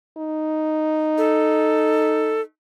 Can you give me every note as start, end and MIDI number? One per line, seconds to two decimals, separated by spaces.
0.17 2.45 63
1.18 2.41 69